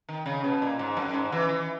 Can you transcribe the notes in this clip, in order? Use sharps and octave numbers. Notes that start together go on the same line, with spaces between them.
D#3
C#3
B2
A#2
G#2
F#2
G#2
E3
E3